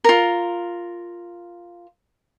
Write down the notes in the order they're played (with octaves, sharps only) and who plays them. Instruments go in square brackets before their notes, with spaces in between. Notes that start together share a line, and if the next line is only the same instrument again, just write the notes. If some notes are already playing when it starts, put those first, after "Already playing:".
[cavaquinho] F4 A#4